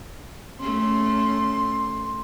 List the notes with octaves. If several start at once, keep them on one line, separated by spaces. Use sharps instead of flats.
A3 C#4 C6